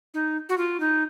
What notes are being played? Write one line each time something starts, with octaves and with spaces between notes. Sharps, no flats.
D#4
F#4
F4
D#4